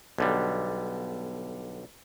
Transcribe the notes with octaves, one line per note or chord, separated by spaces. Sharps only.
B1 D3 G3